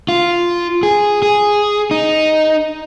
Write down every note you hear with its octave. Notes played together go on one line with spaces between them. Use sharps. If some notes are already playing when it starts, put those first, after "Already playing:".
F4
G#4
G#4
D#4